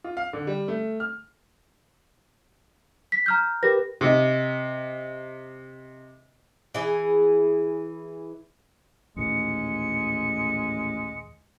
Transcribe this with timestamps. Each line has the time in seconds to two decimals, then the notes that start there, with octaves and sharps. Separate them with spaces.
0.04 F4
0.17 F5
0.33 D3
0.47 G3
0.68 A3
1.00 F6
3.12 B6
3.26 A#5 F6 G6
3.63 G4 A#4 B4 A#6
4.01 C3 D#5
6.74 E3 G#4
9.16 A1 D#2 A#2 G#3 C#7